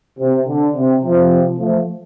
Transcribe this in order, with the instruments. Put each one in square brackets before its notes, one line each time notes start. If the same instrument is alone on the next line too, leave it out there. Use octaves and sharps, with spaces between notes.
[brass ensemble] C3
D3
C3
C3 F3
F3 A3